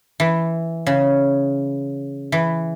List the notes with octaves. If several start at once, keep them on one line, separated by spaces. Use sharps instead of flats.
E3
C#3
E3